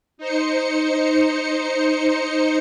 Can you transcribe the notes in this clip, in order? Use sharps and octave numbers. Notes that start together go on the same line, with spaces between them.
D#4 C5 C#7